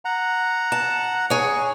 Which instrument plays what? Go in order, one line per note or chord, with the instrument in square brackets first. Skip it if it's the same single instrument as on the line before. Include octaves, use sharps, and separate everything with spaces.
[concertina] F#5 A#5
[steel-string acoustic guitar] A5
G#4 C#5